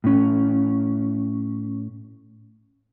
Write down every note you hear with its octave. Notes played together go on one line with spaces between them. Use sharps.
A2 C#4